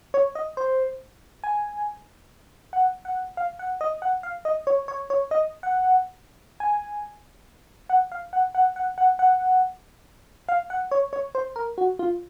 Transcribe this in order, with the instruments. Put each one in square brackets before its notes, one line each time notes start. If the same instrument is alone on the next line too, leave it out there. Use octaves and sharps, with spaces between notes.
[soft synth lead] C#5
D#5
C5
G#5
F#5
F#5
F5
F#5
D#5
F#5
F5
D#5
C#5
C#5
C#5
D#5
F#5
G#5
F#5
F5
F#5
F#5
F#5
F#5
F#5
F5
F#5
C#5
C#5
C5
A#4
F#4
F4